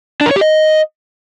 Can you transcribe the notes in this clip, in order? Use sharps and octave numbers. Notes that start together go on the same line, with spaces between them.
D4
A#4
C#5
G4
D#5